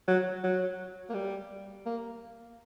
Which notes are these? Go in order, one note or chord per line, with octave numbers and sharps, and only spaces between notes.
F#3
F#3
A#3
G3
A#3